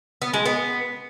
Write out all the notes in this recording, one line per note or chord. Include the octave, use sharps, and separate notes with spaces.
B3
G#3
B3